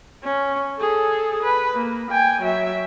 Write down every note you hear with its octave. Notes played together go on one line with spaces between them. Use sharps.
C#4
G#4 A4
B4
A#3
G5 G#5
F#3 E5